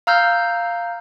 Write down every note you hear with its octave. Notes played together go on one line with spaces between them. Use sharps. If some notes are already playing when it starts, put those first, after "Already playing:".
F5 A#5 E6 F6 G6